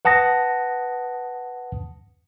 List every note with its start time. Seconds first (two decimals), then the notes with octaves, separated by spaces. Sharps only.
0.05 B4 F#5 A5 D#6 A#6